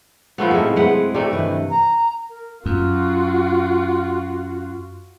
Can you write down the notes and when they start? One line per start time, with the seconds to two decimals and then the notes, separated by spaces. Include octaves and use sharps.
0.38 F3 A3 B3
0.51 A2 C3 G#3 C#4 E4
0.76 G#3 C4 G#4 B4 F#5
1.14 C3 A3 D5
1.31 G2 D#3 E3
1.70 A#5
2.29 A#4
2.66 F#2 F4 F#4